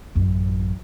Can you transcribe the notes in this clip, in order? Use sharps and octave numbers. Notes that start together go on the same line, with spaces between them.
A1 F#2